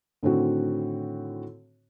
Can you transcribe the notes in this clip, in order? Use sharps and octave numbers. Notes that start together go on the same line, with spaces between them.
A2 D3 D#3 C4 F#4